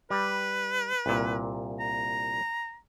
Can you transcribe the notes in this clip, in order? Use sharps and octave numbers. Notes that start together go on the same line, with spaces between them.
G3 B4
C2 A#2
A#5